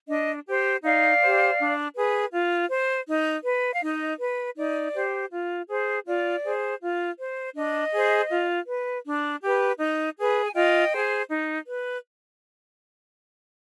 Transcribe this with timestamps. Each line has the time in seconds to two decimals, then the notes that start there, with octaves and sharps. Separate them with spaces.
0.08 D4 D#5
0.47 G4 C5
0.83 D#4 D5 F5
1.21 G4 C5
1.58 D4
1.95 G#4 B4
2.33 F4
2.70 C5
3.07 D#4
3.45 B4
3.74 F5
3.82 D#4 D#5
4.20 B4
4.57 D#4 D5
4.94 G4 C5
5.31 F4
5.69 G#4 C5
6.06 F4 D5
6.44 G#4 C5
6.80 F4
7.19 C5
7.55 D4 D#5
7.92 G#4 C5
8.30 F4
8.67 B4
9.05 D4
9.42 G4 B4
9.80 D#4
10.17 G#4 B4
10.43 G#5
10.54 F4 D#5 G5
10.91 G#4 C5
11.29 D#4
11.67 B4